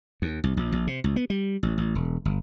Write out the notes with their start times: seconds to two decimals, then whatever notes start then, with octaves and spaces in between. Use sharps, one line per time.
0.22 D#2
0.44 C2
0.57 A#1
0.72 A#1
0.87 C3
1.04 C#2
1.16 B3
1.30 G3
1.63 A1
1.78 A1
1.95 E1
2.25 G1